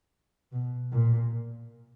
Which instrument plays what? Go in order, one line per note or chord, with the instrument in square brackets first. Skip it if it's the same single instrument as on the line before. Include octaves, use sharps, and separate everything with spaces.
[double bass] B2
A#2